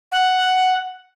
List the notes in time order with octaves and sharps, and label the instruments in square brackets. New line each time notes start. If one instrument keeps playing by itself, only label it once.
[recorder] F#5